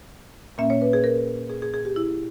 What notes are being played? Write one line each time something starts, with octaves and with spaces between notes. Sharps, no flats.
A#2 A#3 C#4 E5
C#5
B4
G#4
A#4
G#4
G#4
G#4
G4
E4